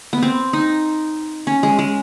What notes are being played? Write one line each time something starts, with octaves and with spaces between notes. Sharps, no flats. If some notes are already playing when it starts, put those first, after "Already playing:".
B3
C4
D#4
C#4
G#3
G#3